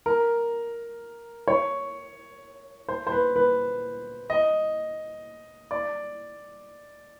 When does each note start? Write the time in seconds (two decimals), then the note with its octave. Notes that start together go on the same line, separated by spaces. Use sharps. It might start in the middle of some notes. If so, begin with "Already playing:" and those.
0.06 A#4
1.48 C#5
2.89 C5
3.07 C5
3.12 B4
3.36 B4
4.30 D#5
5.71 D5